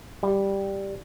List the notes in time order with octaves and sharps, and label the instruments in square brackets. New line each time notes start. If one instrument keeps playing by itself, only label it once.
[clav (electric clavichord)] G3